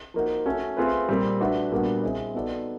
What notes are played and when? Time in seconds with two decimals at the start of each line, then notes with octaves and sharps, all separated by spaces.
0.14 F3 A#3 D#4 F#4
0.46 A3 C#4 F#4 A4
0.77 A3 C4 F4 G#4 B4
1.09 A#2 G3 C4
1.40 A3 D4 F#4 B4 E5
1.71 A#2 G3 B3 D4 F#4
2.03 C4 E4 G#4 C5 D#5
2.34 B3 D#4 F#4 A4 D5